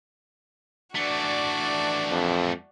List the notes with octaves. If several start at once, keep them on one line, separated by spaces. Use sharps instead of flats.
E3 A3 D4 F#4 D5
F2